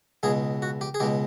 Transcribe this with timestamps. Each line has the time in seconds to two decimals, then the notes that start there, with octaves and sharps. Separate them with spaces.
0.23 C#2 B2 G#3 G#4
0.62 F#4
0.81 G4
0.94 G#4
1.00 C#2 B2 G#3 G4